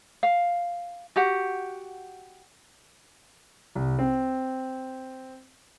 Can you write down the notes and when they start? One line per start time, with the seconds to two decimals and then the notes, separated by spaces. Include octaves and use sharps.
0.23 F5
1.16 F#4 G4 F#5
3.75 C2
3.99 C4